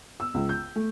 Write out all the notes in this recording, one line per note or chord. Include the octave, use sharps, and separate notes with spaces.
E6
C#2
G6
A3